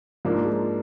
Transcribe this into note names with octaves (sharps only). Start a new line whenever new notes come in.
G#2 F3 A#3 D4 F4
G#3